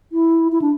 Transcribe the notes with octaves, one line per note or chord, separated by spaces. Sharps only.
E4
E4
D4